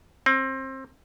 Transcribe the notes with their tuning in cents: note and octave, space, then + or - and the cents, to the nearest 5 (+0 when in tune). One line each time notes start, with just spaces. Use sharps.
C4 +25